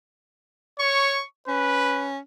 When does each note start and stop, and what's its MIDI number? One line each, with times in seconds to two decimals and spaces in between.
0.80 1.21 73
0.80 1.24 85
1.48 2.19 61
1.48 2.10 71